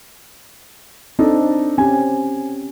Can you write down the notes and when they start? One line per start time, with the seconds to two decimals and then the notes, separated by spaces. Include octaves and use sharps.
1.19 C4 D4 D#4 A4
1.78 C4 C#4 G4 G#5